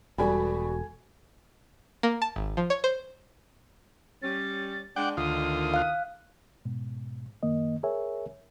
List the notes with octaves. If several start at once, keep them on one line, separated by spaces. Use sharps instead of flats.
E1 B2 G3 F#4 A4 G#5 B5
A#3
A5
G#1
F3
C#5
C5
G3 C#4 A6
G#3 D4 F#5 G5 D6
D2 D#3 F4 D#6
F5 F#6
G#2 B2
F#2 D#3 A#3 D#5
G#4 A#4 C#5 E5 G#5